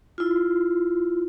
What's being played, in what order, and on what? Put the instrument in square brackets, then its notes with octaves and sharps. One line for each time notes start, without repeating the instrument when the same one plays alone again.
[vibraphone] E4 F4